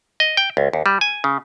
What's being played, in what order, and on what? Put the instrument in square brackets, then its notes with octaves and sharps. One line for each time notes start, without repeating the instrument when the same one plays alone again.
[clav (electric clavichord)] D#5
G5
C#2
D#2
G3
G#5
C#3